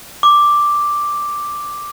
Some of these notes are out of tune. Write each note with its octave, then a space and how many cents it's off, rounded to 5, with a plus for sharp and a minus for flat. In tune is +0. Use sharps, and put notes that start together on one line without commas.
D6 +0